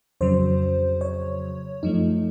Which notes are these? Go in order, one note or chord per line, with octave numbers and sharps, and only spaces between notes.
F2 C#3 F#3 C5
C#5
F#2 F3 A3 D#4